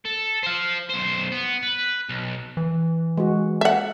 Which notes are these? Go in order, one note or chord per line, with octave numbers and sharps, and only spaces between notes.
A4
C5 F5
B1 C5
B3
B4
B1
E3
G#3 F#4
E5 F#5